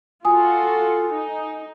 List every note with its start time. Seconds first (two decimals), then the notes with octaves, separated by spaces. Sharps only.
0.25 F4 F#4 A4 G#5 D#6
1.13 D#4